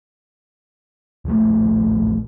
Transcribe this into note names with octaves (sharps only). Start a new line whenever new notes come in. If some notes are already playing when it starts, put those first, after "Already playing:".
D#1 A#1 A2 A3